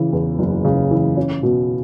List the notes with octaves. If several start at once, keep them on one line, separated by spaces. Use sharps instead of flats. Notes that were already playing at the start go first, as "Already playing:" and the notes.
Already playing: C#3 E3
E2
F#1
C#3
E3
C#4
B2